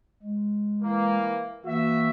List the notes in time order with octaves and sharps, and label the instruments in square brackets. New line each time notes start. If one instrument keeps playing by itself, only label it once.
[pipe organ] G#3
[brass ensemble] E3 A#3
[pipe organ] E3 A#3 [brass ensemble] F#4 E5